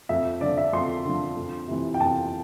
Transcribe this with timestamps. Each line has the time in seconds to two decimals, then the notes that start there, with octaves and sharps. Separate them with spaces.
0.09 F2 E5
0.41 D3 F3 D5
0.58 E5
0.73 F2 C6
1.05 D3 F3
1.37 F2
1.67 C3 E3
1.94 G5
2.00 F2 A5